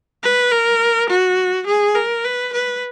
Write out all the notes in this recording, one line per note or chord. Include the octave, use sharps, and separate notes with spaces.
B4
A#4
F#4
G#4
A#4
B4
B4